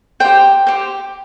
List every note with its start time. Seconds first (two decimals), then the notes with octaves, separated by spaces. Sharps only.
0.20 G4 C5 G5
0.67 G4 C5